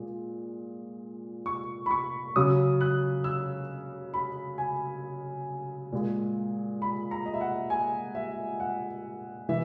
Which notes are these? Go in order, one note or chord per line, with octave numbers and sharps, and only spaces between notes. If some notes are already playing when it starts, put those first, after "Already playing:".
Already playing: A#2 G#3
C#6
B5
C#6
C#3 F#3 D#6
F#6
E6
B5
G#5
A#2 G#3
B5
A#5
D#5
E5
F#5
G#5
E5
F#5
E3 E5